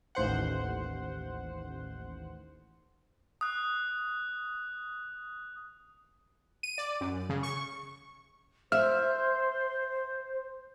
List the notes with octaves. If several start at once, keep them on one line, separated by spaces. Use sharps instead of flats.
A1 D#2 C5 F#5
D#6 F#6
D#7
D5
F#2
C#3
C#6
C5 E5 F6